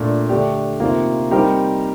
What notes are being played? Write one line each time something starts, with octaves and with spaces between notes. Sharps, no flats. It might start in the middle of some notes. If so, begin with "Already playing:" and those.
Already playing: A#2 A3 D4
D3 A3 D4 G4
C3 D#3 A#3 F4
G3 C4 D#4 G4 A#4